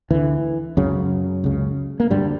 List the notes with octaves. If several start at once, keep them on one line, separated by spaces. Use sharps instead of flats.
D2 D3 E3
C#2 F#2 C#3 F#3
C#2 C#3
A#3
D2 G2 D3 G3